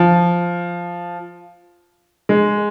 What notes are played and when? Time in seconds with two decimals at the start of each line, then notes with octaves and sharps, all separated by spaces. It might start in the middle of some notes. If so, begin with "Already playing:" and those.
Already playing: F3
2.29 G#3